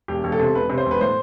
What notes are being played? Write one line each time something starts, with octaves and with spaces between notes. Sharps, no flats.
E1 G4
E1
A4
C3
E1 B4
C3
C5
E1
B4
A2 C5